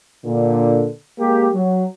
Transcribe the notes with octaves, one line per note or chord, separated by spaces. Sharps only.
A#2 D3
G#3 A#3 G4
F#3